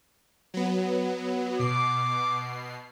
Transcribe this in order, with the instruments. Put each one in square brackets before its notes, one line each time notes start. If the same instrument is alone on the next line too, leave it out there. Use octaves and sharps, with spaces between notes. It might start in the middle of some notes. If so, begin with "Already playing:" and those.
[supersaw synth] F#3 B3
[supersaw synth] B2 C7 [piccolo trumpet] D6